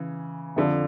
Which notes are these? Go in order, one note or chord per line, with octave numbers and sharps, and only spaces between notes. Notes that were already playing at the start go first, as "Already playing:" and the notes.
Already playing: C#3 E3
F2 D3 F3